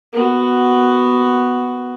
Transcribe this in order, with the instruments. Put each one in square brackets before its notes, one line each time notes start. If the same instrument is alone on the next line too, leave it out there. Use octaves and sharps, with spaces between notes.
[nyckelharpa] B3 F#4